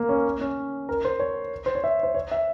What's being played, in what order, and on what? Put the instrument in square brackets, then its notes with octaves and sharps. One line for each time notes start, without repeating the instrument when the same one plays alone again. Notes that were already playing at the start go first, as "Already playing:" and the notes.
Already playing: [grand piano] A#3
C#4
C#4
A#4
C5
C#5
C5
C#5
E5
C5
C#5
E5